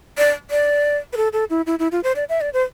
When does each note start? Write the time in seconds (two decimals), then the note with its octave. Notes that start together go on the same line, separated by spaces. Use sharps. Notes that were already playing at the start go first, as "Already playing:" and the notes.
0.18 D5
0.51 D5
1.13 B4
1.17 A4
1.33 A4
1.50 E4
1.67 E4
1.79 E4
1.92 F4
2.04 C5
2.16 D5
2.29 E5
2.41 D5
2.53 C5